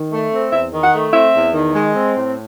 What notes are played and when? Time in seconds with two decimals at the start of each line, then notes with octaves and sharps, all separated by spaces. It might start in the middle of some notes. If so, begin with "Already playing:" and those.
Already playing: D#3
0.12 A3
0.31 C4
0.52 E2 E5
0.72 D#3
0.82 F#5
0.93 A3
1.13 C4 E5
1.33 E2
1.54 D#3
1.75 G#3
1.95 C4
2.16 A2